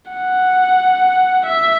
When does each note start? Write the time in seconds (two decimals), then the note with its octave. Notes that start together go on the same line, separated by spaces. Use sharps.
0.11 F#5
1.46 E5